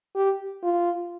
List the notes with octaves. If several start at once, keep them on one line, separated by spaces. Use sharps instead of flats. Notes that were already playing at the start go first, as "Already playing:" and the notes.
G4
F4